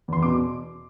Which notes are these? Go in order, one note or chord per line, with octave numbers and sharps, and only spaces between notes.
E2 C6
B2 D6